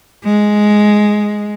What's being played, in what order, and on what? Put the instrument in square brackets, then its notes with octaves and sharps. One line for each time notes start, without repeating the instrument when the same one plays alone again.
[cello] G#3